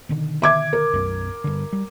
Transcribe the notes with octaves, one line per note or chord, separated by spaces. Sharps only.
B2 D3 D#3
E5 D6 G#6
A#4
B1 F#2
G2 D3
G3